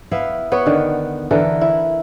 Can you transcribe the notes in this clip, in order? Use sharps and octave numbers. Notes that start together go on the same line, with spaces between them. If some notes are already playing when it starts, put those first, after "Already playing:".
B3 E4 E5 F5
B3 C#5
D3 D#3
D3 E3 A4 A#4
E4